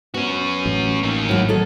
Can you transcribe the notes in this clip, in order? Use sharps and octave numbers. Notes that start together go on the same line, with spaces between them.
B3 C#4 F#4
A1
A#3 D#4
A2 F#3
D#3 F#3 A4